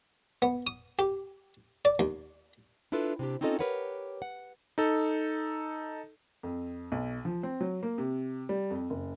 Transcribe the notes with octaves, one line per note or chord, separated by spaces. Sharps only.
B3
D#6
G4
D5
D#2
D4 E4 F4 A4 B4
C3 D4 G4
C4 C#4 D#4 F4 A4 D#5
G4 G#4 A#4 B4 C#5 F#5
F#5
D#4 A4
F2
B1
F3
C4
F#3
A#3
C3
G3
F2
F#1